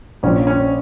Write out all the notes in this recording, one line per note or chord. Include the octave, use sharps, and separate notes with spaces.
A#1 C#4
C#4